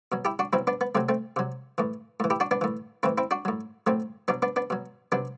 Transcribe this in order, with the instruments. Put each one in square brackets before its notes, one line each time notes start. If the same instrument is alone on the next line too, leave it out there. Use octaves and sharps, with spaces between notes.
[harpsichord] B2 F#3
E4 G4
D4 F#4
B2 F#3 C4 E4
B3 D4
B3
C3 F#3 A3 C4
A3 C4
C3 F#3
A2 E3
A2 E3
E4 G4
D4 F#4
B3 D4
A2 E3
A2 E3 C4 E4
C4 E4
D4 F#4
A2 F#3
A2 F#3 A3 C4
B2 F#3 B3 D4
B3 D4
B3 D4
B2 F#3
C3 F#3 B3 D4